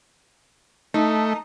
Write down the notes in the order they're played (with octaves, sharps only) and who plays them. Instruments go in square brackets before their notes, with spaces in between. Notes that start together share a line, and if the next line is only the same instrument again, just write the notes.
[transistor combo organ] A3 [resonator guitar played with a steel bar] D#4